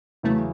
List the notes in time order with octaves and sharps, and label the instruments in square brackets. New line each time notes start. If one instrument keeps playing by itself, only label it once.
[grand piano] E2 C#3 F#3 C#4 E4 [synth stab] A3